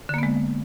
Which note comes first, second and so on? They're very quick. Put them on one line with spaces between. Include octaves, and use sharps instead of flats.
D3 A#3 B3 G#3